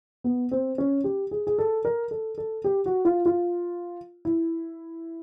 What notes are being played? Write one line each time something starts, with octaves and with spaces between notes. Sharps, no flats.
B3
C4
C#4
G4
G#4
G#4
A4
A#4
A4
A4
G4
F#4
F4
F4
E4